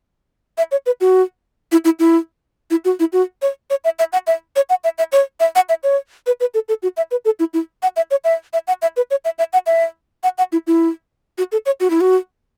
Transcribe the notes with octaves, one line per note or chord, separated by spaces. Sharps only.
E5
C#5
B4
F#4
E4
E4
E4
E4
F#4
E4
F#4
C#5
C#5
E5
E5
F#5
E5
C#5
F#5
E5
E5
C#5
E5
F#5
E5
C#5
B4
B4
A4
A4
F#4
E5
B4
A4
E4
E4
F#5
E5
C#5
E5
E5
F#5
E5
B4
C#5
E5
E5
F#5
E5
F#5
F#5
E4
E4
F#4
A4
C#5
F#4
E4
F#4